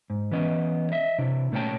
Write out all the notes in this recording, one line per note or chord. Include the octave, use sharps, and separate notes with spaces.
G#2
E3 B3 C#4 D#5
D#5 E5
C3 D4 E4
A#2 A3 B3 C#4 G5 A5